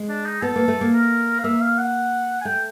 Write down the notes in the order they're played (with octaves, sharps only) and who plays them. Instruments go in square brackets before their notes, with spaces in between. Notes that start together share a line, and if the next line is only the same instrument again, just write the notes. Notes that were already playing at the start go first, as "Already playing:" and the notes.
Already playing: [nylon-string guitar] G#3
[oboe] D4
D#4
[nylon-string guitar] B3 [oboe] A4
[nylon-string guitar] A#3
A3
A#3
[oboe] A#4
F5
[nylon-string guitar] A#3 [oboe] E5
[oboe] F5
F#5
G#5
[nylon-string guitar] A3 [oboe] G5